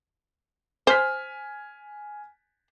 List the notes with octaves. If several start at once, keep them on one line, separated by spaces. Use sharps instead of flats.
C5 G#5 F6 B6